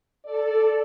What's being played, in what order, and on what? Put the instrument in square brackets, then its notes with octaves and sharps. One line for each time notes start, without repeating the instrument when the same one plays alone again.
[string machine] A4 [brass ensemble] D5